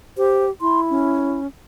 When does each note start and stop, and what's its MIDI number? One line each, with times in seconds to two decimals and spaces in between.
0.17 0.50 67
0.17 0.45 72
0.61 1.39 64
0.61 0.81 84
0.90 1.47 61